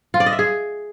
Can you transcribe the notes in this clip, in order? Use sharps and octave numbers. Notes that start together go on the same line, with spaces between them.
F4
D5
D#5
E5
G#4